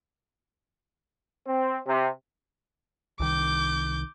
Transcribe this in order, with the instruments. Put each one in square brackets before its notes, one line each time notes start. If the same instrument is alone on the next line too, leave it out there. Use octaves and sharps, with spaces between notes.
[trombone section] C4
C3
[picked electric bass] C2 D#3 [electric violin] D6 G6